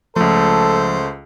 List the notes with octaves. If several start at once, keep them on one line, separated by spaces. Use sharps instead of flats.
C#2 F3 A3 A4 C5